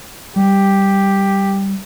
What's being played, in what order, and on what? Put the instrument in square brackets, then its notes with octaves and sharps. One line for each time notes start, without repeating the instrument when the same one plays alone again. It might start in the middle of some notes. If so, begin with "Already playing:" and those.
[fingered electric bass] G3 [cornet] G4